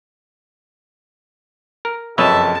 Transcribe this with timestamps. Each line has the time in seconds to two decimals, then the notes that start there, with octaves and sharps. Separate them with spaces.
1.85 A#4
2.18 F#1 F2 B4 C#5 D#5 E5 A5